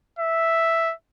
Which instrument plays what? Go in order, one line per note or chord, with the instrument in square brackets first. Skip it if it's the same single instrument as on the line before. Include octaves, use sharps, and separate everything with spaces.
[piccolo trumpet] E5